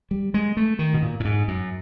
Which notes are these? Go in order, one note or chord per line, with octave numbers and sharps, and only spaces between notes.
G3
G#3
A3
D#3
B2
A#2
A2
G#2
F#2